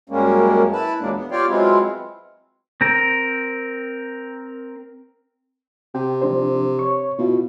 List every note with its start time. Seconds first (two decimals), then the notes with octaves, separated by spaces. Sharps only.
0.09 F#2 G3 G#3 A#3 C#4
0.73 E4 B4 A5
1.00 E2 A#2 F#3 G#3 A#3 D4
1.14 B3
1.32 F4 G4 C#5 D5 F5 G5
1.48 F#3 G#3 B3 C4 E4 F4
2.81 C4 A#4
5.95 C3 G5
6.22 F3 D4 C5
6.79 C#5 C#6
7.18 B2 E4 F4